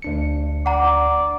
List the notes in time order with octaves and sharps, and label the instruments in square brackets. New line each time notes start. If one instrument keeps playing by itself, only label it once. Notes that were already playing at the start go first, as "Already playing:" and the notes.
[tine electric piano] D2 D4 C#7
[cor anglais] D5 [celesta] F#5 A#5